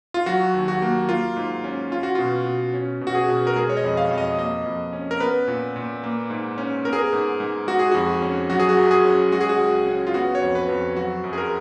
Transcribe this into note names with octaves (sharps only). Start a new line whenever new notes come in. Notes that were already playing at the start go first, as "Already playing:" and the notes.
F4
F#3 F#4
D#2
F#4
A#3
A#3 F4
G#2
C#4
C#4 F4
F#4
B2 F4
B2
C#4
B2
F#4
G#4
B2
A#4
G#3 G#4
C#5
D#5
F2
F5
F2
D#5
A#3 D#5
F2
C#4
A#4
B3 B4
A#2
A#2
A#3
G#2
C#4
B3 A#4
G#4
A#4
G#2
G#2
G#3 F#4
G#4
F2 F#4
C#4
F#3 F#4
G#4
F#4
F#2
G#4
C#4
G#3 F#4
G#4
F#4
C#2
C#4
F4
B3 F#4
C#5
F2
B4
F2
F#3 F#4
F#2
G#4
A#4